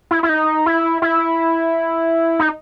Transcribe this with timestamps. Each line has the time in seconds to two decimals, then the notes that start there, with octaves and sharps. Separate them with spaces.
0.11 E4
0.23 E4
0.29 D#4
0.66 E4
1.02 E4
2.39 D#4